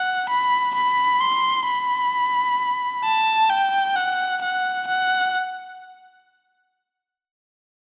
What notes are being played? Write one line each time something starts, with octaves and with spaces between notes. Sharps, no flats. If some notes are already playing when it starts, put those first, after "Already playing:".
Already playing: F#5
B5
B5
C6
B5
A5
G5
F#5
F#5
F#5